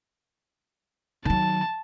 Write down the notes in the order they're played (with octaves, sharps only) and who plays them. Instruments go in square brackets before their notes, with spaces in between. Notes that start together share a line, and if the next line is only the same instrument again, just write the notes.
[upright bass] D#3 F#3 [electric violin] A5